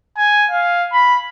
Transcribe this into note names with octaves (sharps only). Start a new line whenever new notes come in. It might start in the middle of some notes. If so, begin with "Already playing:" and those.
G#5
F5
B5